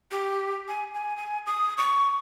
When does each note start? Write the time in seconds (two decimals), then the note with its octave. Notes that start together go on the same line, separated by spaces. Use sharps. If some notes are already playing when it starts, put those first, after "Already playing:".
0.11 G4
0.68 G#5
0.94 G#5
1.17 G#5
1.46 D#6
1.78 C#6